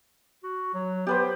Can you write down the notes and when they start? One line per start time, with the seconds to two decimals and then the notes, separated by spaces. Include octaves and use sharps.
0.43 F#4
0.74 F#3
1.07 B3 G4 B4 C5